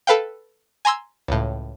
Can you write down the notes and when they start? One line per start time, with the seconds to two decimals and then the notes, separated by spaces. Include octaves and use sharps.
0.07 A4 B4 F5 G5
0.85 G#5 A#5 C6 E6 G#6
1.28 C#2 A2